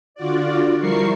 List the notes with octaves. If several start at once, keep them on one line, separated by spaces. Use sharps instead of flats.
D3 F4 F#4 D5
F3 G3 E4 A#4 C#6 C7